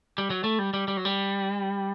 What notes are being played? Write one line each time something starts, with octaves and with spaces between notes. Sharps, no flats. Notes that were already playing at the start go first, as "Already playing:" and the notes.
G3
F#3
A3
G3
G3
G3
F#3
G3